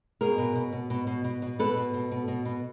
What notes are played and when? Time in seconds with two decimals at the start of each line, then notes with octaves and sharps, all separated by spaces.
0.21 B2 G#4 A#4
0.38 B2
0.56 B2
0.73 B2
0.90 B2
1.07 B2
1.24 B2
1.42 B2
1.59 B2 A4 B4
1.77 B2
1.94 B2
2.12 B2
2.28 B2
2.45 B2